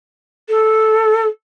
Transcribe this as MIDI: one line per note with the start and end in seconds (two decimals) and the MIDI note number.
0.48 1.27 69